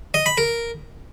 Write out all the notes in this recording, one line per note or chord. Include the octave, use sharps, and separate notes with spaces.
D#5
B5
A#4